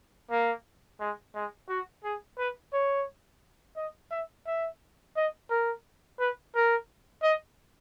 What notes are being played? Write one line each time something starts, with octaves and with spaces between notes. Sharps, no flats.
A#3
G#3
G#3
F#4
G#4
B4
C#5
D#5
E5
E5
D#5
A#4
B4
A#4
D#5